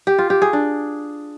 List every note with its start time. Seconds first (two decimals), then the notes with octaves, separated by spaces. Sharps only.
0.07 G4
0.18 F4
0.30 G4
0.42 G#4
0.53 D4